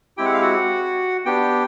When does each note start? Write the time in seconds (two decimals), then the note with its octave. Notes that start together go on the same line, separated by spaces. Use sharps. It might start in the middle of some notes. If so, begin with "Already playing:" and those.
0.17 G#3 C4 E4 G4 G5
0.25 F#5
0.33 F5
0.41 F#4 F#5
1.26 B3 D4 G4 G5